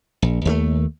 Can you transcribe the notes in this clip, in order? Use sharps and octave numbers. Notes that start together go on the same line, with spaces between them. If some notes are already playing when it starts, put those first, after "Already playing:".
A#1
D#2 G3 A3